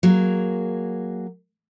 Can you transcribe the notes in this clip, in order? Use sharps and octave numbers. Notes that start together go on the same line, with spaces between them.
F#3 A#3 G#4